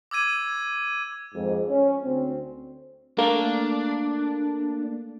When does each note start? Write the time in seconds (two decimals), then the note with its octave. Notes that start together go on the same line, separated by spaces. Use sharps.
0.11 D6 E6 G#6 D#7
1.35 F2 G#2
1.70 C#4
2.04 D2 C4
3.18 A3 A#3 D4